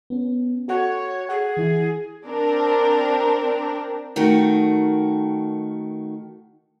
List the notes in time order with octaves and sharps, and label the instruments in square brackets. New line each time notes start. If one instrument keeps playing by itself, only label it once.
[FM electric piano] B3 C#4
[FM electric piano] F#4 A4 F#5 [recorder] C#5
[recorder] G#4 [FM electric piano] F#5
[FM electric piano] E3 E4
[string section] C4 D4 A#4
[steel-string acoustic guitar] D#3 A3 F#4 A#4